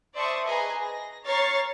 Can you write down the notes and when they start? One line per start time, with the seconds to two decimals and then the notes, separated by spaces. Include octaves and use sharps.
0.14 C5 D5 E5 A5 C#6 D#6
0.46 G#4 B4 D#5 G#5 A#5
0.79 A#6
1.25 C#5 A#5 F6 A6 C7